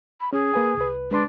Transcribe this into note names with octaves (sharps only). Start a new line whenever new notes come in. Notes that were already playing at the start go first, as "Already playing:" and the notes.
B5
C#4 G#4
A#3 B4 G#5
C2 B4
G#3 D4 B4 C6